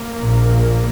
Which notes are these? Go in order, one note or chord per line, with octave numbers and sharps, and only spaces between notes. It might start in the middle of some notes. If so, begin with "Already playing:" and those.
Already playing: A#3
A#1 A#2